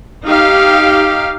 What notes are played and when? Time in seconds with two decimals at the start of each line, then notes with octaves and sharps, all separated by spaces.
0.24 D#4 G4 F5